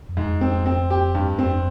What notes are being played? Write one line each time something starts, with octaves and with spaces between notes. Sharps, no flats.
F2
G#2
F2
C4
C4
G4
G2
F2 C4